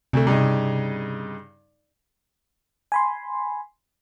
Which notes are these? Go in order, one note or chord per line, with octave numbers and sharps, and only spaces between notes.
D2 C3 A3
G2 C#3 D#4
G#5 B5 C6